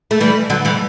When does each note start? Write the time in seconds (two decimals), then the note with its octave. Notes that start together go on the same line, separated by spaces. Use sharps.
0.11 A3
0.21 E3 G3
0.50 D3 F#3
0.65 E3 G3